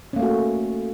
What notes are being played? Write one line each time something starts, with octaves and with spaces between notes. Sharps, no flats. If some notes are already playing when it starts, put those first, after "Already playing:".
A3 A#3 C#4 F#4